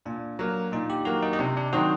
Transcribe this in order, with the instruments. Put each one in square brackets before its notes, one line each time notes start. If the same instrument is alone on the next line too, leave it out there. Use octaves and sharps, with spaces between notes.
[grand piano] A#2 [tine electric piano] D4
[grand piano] F#3 A#3
[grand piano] A#2 [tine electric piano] D#4
[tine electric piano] G4
[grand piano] F#3 A#3 [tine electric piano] F#4
[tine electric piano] D#4
D#4
[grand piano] C3 [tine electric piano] D4
[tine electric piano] D4
[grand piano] D#3 F#3 C4 D#4 [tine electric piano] F#4